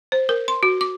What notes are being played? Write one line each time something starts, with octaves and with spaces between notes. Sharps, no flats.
C5
A#4
C6
F#4
D6